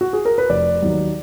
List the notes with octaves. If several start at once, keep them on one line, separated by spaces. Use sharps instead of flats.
F#4
G#4
A#4
B4
F1 D5
D#2 D#3 F#3